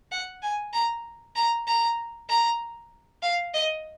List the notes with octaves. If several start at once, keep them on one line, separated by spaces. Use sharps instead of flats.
F#5
G#5
A#5
A#5
A#5
A#5
F5
D#5